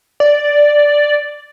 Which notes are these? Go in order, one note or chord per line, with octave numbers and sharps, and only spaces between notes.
D5